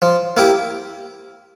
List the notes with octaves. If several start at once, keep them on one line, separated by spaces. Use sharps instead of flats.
F3
A#3 E4 G4